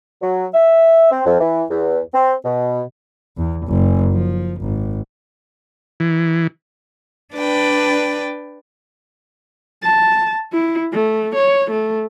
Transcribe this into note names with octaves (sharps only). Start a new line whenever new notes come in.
F#3
E5
C4
F2
E3
E2
C4
B2
E2
F#1
F3
G#1
E3
D4 B4 D5 G5
A5
E4
A3
C#5
A3